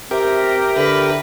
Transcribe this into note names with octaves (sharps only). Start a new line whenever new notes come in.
C4 G4 A#4 E5
D3 B4